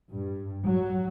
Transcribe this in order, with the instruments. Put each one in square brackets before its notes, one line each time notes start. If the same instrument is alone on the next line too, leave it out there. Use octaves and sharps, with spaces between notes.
[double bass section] G2
F#3